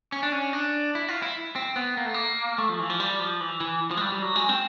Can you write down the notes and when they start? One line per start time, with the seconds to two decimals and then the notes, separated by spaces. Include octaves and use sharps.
0.12 C#4
0.23 D4
0.32 C#4
0.53 D4
0.95 E4
1.08 F4
1.22 E4
1.56 C4
1.76 B3
1.97 A#3
2.05 A3
2.14 A#3
2.58 A3
2.69 F3
2.79 E3
2.90 F3
3.00 G3
3.20 F3
3.40 E3
3.60 E3
3.91 F3
3.97 G#3
4.01 G3
4.12 G3
4.22 F#3
4.36 G#3
4.49 C4